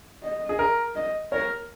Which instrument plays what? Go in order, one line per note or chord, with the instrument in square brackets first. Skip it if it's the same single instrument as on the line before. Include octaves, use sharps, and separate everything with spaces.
[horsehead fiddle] D#5
[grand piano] G#4
A#4
[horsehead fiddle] D#5
[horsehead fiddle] A#4 [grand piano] C#5